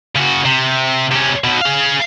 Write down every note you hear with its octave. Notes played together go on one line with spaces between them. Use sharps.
C#3 F#4
C3
C3 C#4
B1 B2
G#4 F5